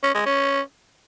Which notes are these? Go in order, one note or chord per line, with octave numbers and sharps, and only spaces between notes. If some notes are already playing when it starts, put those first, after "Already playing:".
C#4
G#3
C#4